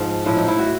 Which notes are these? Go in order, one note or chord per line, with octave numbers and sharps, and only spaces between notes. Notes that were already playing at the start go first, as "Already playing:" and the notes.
Already playing: G#2 F3
A2 F3 E4
D#4
E4
F#4